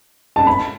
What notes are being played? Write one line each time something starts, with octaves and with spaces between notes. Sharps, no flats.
A5
B5